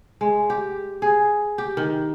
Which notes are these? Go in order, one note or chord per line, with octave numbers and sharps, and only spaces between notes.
G#3
G4
G#4
G4
D#3